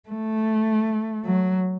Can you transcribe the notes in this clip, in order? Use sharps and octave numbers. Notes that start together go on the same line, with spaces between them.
A3
F#3